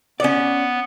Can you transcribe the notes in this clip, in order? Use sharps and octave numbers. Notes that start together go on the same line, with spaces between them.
B3 C#4 D5